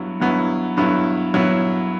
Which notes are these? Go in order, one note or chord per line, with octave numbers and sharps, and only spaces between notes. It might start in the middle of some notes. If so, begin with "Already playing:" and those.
Already playing: G2 F#3 B3 E4
G2 F#3 B3 E4
G2 F#3 B3 E4
G2 F#3 B3 E4